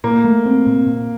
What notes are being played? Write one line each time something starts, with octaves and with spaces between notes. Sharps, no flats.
A#2 A#3
A3
C4
A#2
A#2